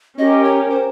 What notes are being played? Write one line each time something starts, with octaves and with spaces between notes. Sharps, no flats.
C#4 G4 A#4 D#5
C#5
C5